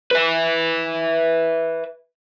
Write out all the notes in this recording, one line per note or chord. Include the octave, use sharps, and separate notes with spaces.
B4 E5